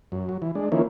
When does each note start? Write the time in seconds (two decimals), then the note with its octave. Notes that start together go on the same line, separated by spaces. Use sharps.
0.12 F#2
0.29 F#3
0.42 E3
0.55 G#3 D4
0.72 D#3 F3 A#3 C#4 E4